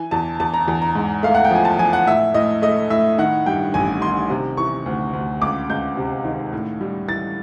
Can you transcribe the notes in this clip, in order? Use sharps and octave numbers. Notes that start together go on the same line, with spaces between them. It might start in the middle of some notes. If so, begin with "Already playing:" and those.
Already playing: E3 G#5
E2 A5
E2 A5
A#5
E2
A#5
G#2
A3 F5
F#5
G5
F3 G#5
A5
F3 G#5
F#5
A2 E5
A2 D#5
A3 D#5
A2 E5
D#3 F#5
G2 G5
A1 G#5
D#3 C6
C3
E3 C#6
D2
D2
C#2 D6
C#2 G6
C3
D#3
A2
G3
E3 A6